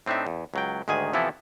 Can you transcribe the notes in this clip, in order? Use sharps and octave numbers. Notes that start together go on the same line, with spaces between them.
A2 C4 D4 D#4 E5
E2
C#2 F#3 G5
D2 G#2 D#3 G#4 G#5
C3 E3 F3 B3 E4 A4